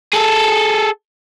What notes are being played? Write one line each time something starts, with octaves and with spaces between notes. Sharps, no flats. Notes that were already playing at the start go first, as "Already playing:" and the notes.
G#4 A4